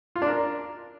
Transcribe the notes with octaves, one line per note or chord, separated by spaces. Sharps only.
F4
D4
A#4